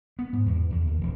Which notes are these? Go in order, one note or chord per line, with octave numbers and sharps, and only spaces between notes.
B3
G#2
E2
E2
D#2
E1